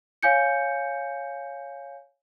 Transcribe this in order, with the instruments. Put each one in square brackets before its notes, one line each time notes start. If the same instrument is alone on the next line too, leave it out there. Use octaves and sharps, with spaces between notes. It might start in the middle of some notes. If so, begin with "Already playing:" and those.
[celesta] C#5 F5 G#5 G6 C#7